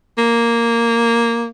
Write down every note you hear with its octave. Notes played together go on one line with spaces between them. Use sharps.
A#3